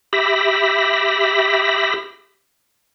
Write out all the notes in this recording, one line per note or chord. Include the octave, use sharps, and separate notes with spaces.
G4 E5 B5 A#6